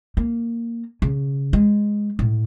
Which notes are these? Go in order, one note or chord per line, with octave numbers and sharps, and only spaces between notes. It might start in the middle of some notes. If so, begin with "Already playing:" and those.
A#3
C#3
G#3
A2